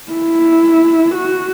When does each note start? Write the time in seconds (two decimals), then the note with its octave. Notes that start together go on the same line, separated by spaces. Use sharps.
0.12 E4
1.15 F#4